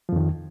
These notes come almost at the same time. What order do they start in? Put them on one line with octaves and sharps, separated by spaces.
F3 F2 D#3